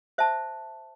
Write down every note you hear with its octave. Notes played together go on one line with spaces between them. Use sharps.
C5 E5 A5